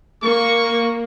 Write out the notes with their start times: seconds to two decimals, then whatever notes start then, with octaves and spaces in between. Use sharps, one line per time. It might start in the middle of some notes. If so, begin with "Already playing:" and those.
0.23 A#3 C#6